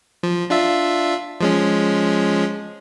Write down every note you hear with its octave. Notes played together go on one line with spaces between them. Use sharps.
F3
D4 F4 E5
F3 G#3 C#4